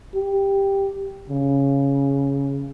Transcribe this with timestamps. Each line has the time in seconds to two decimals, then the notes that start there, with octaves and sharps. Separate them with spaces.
0.15 G4
1.29 C#3